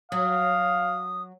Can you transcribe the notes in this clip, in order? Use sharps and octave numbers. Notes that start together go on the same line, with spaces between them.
F#3 F5 D#6